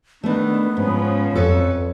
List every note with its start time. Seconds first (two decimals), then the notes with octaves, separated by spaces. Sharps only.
0.23 D#3 A3 B3 D4
0.77 G#2 F3 C#4
1.35 F2 A4 B4 C#5